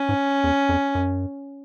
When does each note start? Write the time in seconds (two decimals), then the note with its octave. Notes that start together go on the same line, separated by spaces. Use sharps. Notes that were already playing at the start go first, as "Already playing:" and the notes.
Already playing: C#4
0.09 G#2
0.44 E2
0.69 F2
0.95 F#2